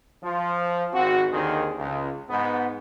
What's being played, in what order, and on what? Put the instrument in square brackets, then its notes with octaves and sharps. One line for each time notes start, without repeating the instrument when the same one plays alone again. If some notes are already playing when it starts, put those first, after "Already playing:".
[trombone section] F3
G#1 C4 F#4
D#2 D3 D#3 C4 G#4
C#2
G#2 B3